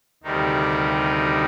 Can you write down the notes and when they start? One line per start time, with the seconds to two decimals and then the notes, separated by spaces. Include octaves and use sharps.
0.23 D2 C3 D#3 G3 D#4